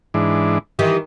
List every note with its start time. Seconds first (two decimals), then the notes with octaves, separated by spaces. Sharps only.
0.14 G#2 E3 D4
0.79 D#3 E3 G4 D#5